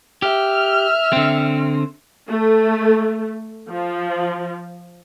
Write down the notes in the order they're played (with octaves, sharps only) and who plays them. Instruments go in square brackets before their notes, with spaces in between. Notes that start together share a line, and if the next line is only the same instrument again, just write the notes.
[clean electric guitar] G4 [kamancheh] E5 F6
[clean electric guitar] D3 C4
[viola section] A3
F3